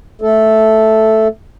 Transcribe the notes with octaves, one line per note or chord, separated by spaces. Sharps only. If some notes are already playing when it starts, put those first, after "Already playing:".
A3 A4